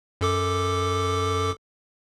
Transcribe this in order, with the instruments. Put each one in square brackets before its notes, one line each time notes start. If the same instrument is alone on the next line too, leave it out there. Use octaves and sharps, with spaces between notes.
[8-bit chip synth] F#2 A4 D6